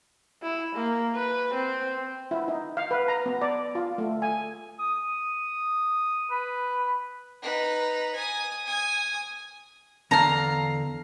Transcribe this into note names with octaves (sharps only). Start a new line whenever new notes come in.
E4
A#3
B4
C4
E4
D#4
F5
B4
A#5
B3
D5
F4
A3
G#5
D#6
B4
D#4 B4
G#5 D#6
G#5 D#6
E2 D3 F5 A5 A#5